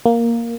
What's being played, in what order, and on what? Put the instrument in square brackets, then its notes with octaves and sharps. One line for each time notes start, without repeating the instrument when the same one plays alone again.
[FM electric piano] A#3